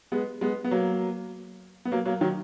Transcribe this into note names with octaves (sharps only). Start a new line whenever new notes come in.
G#3 B3
G#3 B3
B3
F#3 A#3
B3
F#3 A#3
F#3 A#3
D#3 F#3